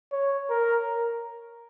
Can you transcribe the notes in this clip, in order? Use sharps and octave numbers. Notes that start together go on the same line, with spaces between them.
C#5
A#4